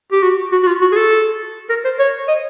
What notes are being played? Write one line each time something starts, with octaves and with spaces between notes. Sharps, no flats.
G4
F#4
F#4
F#4
F4
F#4
G#4
A4
A#4
C5
C#5
D#5